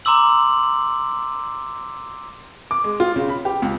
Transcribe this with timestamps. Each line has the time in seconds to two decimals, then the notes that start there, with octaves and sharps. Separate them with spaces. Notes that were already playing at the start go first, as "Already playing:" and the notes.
0.05 A#5 C6 D6 E6 F#7
2.71 D6
2.84 G#3
3.00 F4
3.16 C#3
3.29 B5
3.45 G4
3.62 C#2